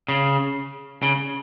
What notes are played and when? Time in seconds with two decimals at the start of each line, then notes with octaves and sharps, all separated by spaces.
0.08 C#3
1.03 C#3